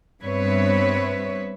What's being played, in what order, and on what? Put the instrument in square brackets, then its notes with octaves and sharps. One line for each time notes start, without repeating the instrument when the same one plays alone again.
[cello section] G2 B3 C4 B4 C#5 E5